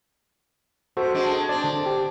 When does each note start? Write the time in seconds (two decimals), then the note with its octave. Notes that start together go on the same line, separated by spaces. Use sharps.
0.97 C3 F#4 A4 C5
1.14 G#3 C4 D4
1.49 C4 D4 D5
1.64 D3
1.86 G4